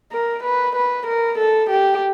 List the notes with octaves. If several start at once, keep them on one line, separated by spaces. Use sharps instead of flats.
A#4
B4
B4
A#4
A4
G4